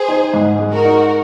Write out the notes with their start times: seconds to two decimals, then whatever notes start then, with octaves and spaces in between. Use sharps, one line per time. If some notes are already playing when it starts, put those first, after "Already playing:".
Already playing: G#4 C5
0.08 D#4
0.34 G#2
0.59 G#3
0.72 F#4 A#4
0.85 D#4